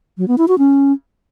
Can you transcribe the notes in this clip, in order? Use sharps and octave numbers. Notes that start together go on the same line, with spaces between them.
F#3
B3
E4
F#4
C#4